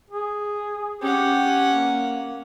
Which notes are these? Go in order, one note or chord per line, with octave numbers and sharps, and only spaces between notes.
G#4
C#4 G4 F#5
A#3